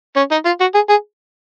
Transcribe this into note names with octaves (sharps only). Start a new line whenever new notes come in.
C#4
D#4
F4
F#4
G#4
G#4